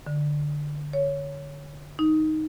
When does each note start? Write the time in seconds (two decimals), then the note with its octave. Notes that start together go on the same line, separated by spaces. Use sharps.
0.07 D3
0.93 C#5
1.99 D#4